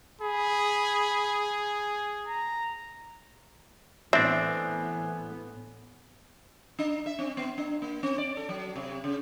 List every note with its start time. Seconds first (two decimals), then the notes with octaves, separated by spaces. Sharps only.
0.21 G#4 B5
2.27 A#5
4.13 A2 E3 B3 C4 D4 E5 G#5
6.79 D4
7.06 E5
7.19 C4
7.37 B3
7.58 D4
7.82 A#3
8.03 C4
8.18 D5
8.37 A4
8.49 F#3
8.76 C3
9.04 C#3